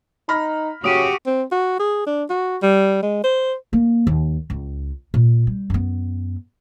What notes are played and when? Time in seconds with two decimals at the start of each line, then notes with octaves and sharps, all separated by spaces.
0.29 D#4 B5 F6 A#6
0.84 C#3 F#4 G4 D#6 D7 D#7
1.26 C4
1.52 F#4
1.79 G#4
2.06 D4
2.30 F#4
2.62 G3
3.02 G#3
3.24 C5
3.73 A#3
4.07 D#2
4.50 C#2
5.14 A#2
5.47 G3
5.70 F#2 B3